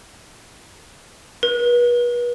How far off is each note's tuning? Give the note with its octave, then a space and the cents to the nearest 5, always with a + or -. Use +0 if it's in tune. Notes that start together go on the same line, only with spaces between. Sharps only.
B4 -35